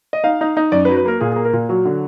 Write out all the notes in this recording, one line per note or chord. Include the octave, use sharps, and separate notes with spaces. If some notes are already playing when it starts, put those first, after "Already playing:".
D#5
D#4 F5
D#4
D#4
F#2 D5
B4
F#3
B4
A#3 A#4
A#2 G#4
G#4
A#3
A#4
A#2
F#3 F#4
D3